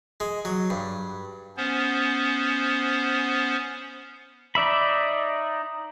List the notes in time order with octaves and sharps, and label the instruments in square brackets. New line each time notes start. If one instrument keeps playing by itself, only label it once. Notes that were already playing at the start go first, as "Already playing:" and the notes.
[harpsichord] G#3
F#3
G2
[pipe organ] B3 C#4 C5
[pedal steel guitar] D#4 D5 E5 B5